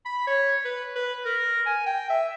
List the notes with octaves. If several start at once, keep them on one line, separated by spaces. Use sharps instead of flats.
B5
C#5
B4
B4
A#4
G#5
G5
E5